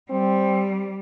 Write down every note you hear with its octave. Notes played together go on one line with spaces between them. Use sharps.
G3 C4